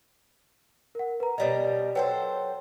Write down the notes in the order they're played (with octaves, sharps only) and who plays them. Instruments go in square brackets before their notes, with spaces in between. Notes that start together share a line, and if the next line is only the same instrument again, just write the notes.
[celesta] A#4 F#5
B4 A#5
[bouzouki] B2 G3 A#4 [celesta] C#5 D#5
[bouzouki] F#3 A4 C5 [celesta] B4 F#5 G5